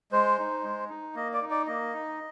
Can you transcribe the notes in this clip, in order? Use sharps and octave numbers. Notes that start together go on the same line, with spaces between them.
G#3 C5
D#4
G#3
D#4
A#3 D#5
D5
D#4
D5
A#3 D#5
D#4